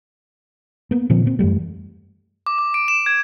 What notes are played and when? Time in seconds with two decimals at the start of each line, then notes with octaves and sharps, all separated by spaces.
0.91 A#3 B3
1.10 A#2 D3 F3 C4
1.26 A#3 C4
1.39 F#2 E3 G3 A3
2.47 D6
2.58 D6
2.74 D7
2.88 E7
3.06 G#6